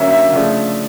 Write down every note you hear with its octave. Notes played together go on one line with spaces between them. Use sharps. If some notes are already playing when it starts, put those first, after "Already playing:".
Already playing: D3 F#3 A#3 C#4 E5
E5
C#3 F3 A3 D4